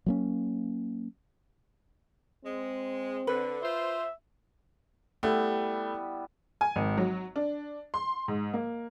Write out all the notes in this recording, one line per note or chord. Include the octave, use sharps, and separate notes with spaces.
F#3 A#3 C#4
G#3 C4
D3 B4
F4 C5 E5
G3 A3 B3 E4
G#5
G#1
F#3
D4
C6
G#2
A#3